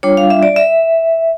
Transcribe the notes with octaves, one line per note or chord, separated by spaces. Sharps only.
G3 D4 F4 C#5
F5
E5
D5
E5